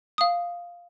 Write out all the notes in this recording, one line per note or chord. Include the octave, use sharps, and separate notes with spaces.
F5 D#6